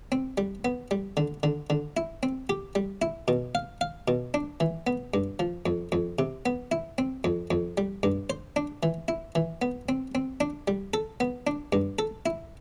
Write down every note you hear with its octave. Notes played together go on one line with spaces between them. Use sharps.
C4
G3
B3
G3
D3
D3
D3
E4
C4
G4
G3
E4
B2
F5
F5
B2
D4
E3
B3
G2
F3
F2
F2
C3
B3
E4
C4
F2
F2
G3
G2
C5
D4
E3
E4
E3
B3
C4
C4
D4
G3
A4
B3
D4
G2
A4
E4